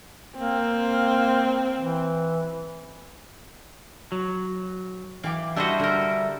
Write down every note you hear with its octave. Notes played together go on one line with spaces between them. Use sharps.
A#3 C4
E3
F#3
E3 F5 G5 D6
G3 D4 E4 F#4 C5 D#5 E5
D3 A#4